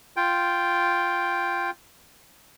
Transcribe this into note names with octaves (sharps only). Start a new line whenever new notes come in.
F4 G5